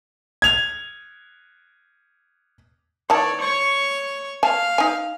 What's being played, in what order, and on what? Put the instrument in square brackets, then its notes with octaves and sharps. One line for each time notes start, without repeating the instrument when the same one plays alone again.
[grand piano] G#6 F7
[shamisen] D#3 E3 A5 [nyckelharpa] C#5 D5
[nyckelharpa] C#5 C#6
[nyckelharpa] F5 [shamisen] G#5 A5
[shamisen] D#4 G#5